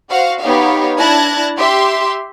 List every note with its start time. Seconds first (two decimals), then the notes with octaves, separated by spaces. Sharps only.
0.10 F#4 C5 F5 F#5
0.41 B3 D#4 G4 C#5 F5
0.98 D4 E4 A5 F#6 G#6 A#6
1.57 G4 E5 C6